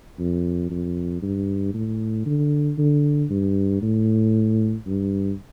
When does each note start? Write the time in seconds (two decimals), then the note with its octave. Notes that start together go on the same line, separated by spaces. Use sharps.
0.19 F2
0.70 F2
1.22 G2
1.74 A2
2.26 D3
2.78 D3
3.30 G2
3.82 A2
4.86 G2